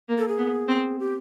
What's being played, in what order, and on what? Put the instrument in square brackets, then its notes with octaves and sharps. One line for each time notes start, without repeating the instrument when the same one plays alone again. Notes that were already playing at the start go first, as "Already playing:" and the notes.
[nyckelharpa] A#3
[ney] A4
G#4
[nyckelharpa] B3
C4
[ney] G4